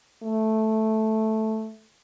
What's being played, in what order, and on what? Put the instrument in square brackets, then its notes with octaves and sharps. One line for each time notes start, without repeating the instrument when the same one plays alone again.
[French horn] A3